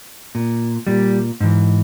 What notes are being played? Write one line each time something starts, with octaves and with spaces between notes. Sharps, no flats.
A#2
A#2 G3
G#2 E3